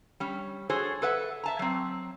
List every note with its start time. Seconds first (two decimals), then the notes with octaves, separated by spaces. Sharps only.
0.20 G3 C#4
0.70 F#4 G#4 A4 C5 C#5
1.02 A4 B4 E5 F#5
1.43 E5 A5 A#5
1.59 F#3 C4